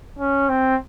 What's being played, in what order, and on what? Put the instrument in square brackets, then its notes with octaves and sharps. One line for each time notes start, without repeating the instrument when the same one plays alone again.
[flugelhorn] C#4
C4